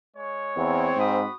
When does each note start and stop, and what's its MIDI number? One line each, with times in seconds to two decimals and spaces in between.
0.15 0.96 56
0.15 0.96 73
0.57 0.90 40
0.57 1.29 60
0.96 1.25 44
0.96 1.34 66
0.96 1.34 83
0.96 1.34 87